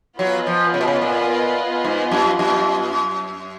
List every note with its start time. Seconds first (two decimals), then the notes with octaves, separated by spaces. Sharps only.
0.19 F#3 B3 F4 B4 D#5 G#5
0.47 F3
0.74 C#3
0.81 B2
0.88 C#3
1.02 A#2
1.84 G#2
2.11 F#2
2.39 F#2